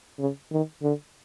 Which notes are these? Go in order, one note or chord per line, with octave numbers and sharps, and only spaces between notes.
C#3
D#3
D3